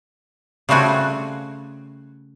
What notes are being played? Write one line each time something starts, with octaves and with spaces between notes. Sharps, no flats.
C#3 G3 A3 C4 F#4 G#5